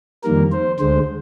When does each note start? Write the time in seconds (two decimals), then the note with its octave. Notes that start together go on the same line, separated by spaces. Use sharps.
0.23 F2 D#3 G3 A#3 A#4
0.52 C5
0.80 D2 D3 G#3 C5